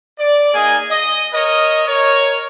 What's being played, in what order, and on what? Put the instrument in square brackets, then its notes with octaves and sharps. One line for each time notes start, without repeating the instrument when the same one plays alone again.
[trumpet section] D5
A#3 D#4 G#4 D#5 G#5
D#5
A#4 C#5 D#5
A#4 C#5